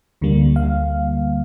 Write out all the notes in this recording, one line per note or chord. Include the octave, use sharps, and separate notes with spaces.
D2 D3 G3 A#3
F5